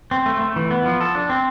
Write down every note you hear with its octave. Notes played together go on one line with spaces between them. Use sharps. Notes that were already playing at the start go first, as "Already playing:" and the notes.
C4
A3
A3
E3
B3
F3
A4
D4
C4